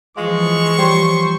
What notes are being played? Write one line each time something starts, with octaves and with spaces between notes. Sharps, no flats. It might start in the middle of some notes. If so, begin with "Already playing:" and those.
E3 F3 G#3 F4 D#5 C#6
G3 G4 C5 C#5